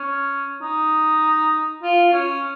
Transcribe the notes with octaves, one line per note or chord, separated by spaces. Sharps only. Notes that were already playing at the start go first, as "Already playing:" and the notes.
Already playing: C#4
D#4
F4
C#4